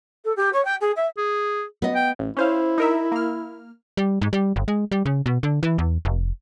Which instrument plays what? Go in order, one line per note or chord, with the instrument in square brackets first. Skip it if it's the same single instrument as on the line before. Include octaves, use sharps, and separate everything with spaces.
[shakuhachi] A4
G4
C#5
G5
G#4
E5
[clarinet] G#4
[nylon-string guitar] B3 D#5
[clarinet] G5
[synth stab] A1
[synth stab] C#4 C5 F5 [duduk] E4
[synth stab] D#4 A#4 E5
A#3 F6
[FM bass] G3
G#2
G3
G1
G#3
G3
C#3
B2
D3
E3
E2
F1